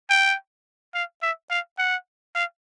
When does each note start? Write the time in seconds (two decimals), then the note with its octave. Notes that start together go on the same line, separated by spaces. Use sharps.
0.10 G5
0.94 F5
1.22 E5
1.50 F5
1.78 F#5
2.35 F5